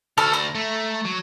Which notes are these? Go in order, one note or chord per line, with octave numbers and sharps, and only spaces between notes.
D2 F#4 A4 F6
A#5
A3
F#3